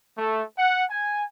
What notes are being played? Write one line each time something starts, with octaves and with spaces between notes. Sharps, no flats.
A3
F#5
G#5